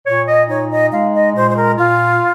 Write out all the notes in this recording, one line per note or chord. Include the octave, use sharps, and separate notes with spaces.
A#2 C#5
D#5
D#4 C#5
D#5
G#3 F5
D#5
A#2 C5
C5
A#4
A#2 F4